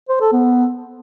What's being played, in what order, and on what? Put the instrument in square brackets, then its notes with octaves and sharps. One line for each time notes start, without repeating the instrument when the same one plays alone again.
[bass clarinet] C5
A4
B3